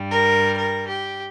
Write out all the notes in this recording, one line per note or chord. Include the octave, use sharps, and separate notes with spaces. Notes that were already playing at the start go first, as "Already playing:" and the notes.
Already playing: G2 G3
A#4
A#4
G4